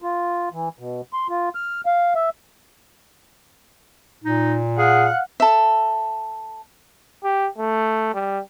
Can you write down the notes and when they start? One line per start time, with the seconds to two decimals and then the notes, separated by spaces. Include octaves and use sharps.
0.02 F4
0.52 E3
0.79 B2
1.13 C6
1.29 F4
1.55 F6
1.86 F5
2.15 E5
4.24 A#2 D#4
4.79 G#4 F5 F#5
5.40 A4 E5
7.24 G4
7.58 A3
8.14 G3